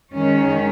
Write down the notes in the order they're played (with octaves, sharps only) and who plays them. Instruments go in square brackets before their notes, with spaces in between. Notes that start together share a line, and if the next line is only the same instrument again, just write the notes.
[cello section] D#3 G#3 C#4